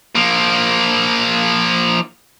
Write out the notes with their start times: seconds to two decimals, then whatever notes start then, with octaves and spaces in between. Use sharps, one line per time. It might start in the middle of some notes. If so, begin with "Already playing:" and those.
0.15 F3 A#3